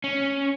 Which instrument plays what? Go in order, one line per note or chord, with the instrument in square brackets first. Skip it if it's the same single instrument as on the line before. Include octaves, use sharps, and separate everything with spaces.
[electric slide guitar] C#4